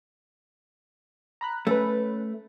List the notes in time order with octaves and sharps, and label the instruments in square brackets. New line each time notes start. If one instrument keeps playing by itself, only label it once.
[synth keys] A#5 B5 F#6
[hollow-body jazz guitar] A3 [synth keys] C#4 B4